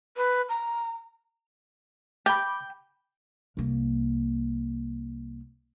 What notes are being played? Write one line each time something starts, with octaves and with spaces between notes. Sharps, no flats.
B4
A#5
G5 B5 D6
C2 A#3